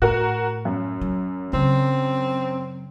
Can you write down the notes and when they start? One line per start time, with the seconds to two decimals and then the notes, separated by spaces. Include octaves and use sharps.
0.02 A2 F#4 A#4
0.65 F#2
1.01 F#3
1.53 C#3 F#3 C4